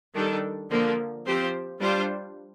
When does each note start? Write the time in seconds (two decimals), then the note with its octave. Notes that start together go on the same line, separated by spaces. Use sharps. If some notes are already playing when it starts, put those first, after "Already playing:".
0.14 D#3 G3 D4 A4
0.70 D3 F3 A#3
1.25 F3 C4 G4 C5
1.80 G3 D4 F4 C5